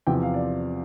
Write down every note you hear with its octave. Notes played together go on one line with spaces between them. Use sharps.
E2 C3 F3 G5
F5
D5